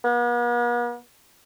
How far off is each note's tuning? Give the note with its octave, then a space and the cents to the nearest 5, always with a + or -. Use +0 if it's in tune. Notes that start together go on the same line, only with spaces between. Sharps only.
B3 -45